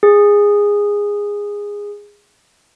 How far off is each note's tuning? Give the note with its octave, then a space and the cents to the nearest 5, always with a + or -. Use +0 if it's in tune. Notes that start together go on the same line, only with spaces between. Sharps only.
G#4 -15